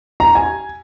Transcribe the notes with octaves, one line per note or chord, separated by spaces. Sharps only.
A#5
G#5